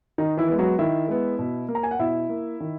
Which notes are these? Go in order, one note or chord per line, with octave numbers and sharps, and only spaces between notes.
D#3 D#4
E3 E4
G#3 B3
F#3 F#4
D#3 E4 E5
G#3 B3
B2
A#3
A#5
G#5
F#5
B2 E4 E5
A#3
D#3